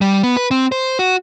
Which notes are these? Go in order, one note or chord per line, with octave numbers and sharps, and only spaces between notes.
G3
B3
B4
C4
C5
F#4